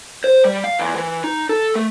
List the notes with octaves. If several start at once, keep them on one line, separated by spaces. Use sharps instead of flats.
C5
G3
F5
E2
E3
D#4
A4
A3